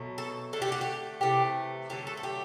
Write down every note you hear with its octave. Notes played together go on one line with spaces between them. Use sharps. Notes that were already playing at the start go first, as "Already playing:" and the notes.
Already playing: B2 F#3 A3
A4
D3 A3 A4
G4
F#4
G4
C3 E3 A3 G4
D3 F#3 A3 G4
A4
A4
G4